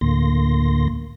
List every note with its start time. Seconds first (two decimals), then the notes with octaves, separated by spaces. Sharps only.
0.01 D2 A2 D3 A#3 C6 A#6